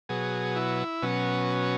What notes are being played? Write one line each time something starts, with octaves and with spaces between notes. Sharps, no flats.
B2 F#3 G#4
E4
B2 F#3 C#4